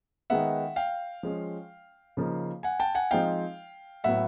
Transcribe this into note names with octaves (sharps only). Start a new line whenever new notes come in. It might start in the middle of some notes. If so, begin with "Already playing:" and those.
D#3 G#3 B3 D#4 E5 F#5
F5 G5
F3 G#3 C#4
C#3 F3 A#3 D#4
F#5 G#5
G5 A5
F#5 G#5
F3 G#3 C4 D#4 F5 G5
A2 F#3 B3 E5 F#5